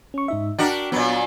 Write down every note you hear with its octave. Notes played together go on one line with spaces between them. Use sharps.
C#4 C#6
G#2 D#4 E5
D4 F#4 A#4 G5 B6
A#2 F#3 B3 B5 A6